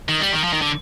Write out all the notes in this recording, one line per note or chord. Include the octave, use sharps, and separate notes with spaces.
D#3
G3
D#3
F3
D#3
D3